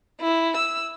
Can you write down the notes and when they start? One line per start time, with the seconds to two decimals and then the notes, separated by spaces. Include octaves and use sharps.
0.21 E4
0.56 E6